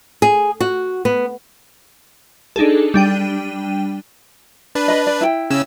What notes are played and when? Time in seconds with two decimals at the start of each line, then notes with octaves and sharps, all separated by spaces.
0.22 G#4
0.60 F#4
1.05 B3
2.56 D4 D#4 G#4 A4
2.94 G3 D4 G5 D#7
4.75 D4 B4
4.88 D#5 B5
5.07 D5
5.21 E4 G5
5.50 C#3 C#4 E6